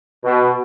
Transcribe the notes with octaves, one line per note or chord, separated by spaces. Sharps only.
B2